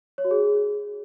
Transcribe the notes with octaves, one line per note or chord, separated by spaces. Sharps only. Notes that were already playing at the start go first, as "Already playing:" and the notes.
C#5
F#4
G#4